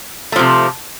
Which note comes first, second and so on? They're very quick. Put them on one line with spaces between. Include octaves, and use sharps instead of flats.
A3 F3 C3